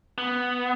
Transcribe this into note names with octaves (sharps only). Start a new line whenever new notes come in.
B3